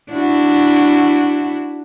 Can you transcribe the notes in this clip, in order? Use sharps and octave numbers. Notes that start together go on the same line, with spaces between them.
D4 E4 F#4